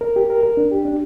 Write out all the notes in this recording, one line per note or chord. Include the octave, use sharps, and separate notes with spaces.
A#4
G4
A#4
A#4
D4
G4
D4